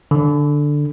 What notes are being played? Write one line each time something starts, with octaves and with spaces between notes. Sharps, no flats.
D3